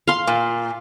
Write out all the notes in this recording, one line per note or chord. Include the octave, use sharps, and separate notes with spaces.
F5 C6
A#2